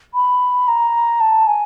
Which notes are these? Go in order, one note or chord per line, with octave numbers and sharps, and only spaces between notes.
B5
A#5
A5
G#5